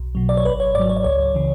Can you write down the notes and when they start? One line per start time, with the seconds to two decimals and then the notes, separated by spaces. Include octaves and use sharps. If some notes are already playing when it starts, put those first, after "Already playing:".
Already playing: B1
0.15 B2 F#3
0.29 D5
0.37 C#5
0.45 G#1 B4
0.60 C#5
0.75 G#2 D5
0.79 F#3
0.89 C#5
0.97 D5
1.04 C#2 C#5
1.35 C#3 E3